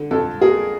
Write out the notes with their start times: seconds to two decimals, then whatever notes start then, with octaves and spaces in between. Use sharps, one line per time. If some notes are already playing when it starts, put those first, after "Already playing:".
Already playing: D3
0.11 F2 A4
0.41 A#3 G#4